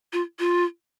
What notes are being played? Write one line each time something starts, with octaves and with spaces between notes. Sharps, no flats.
F4
F4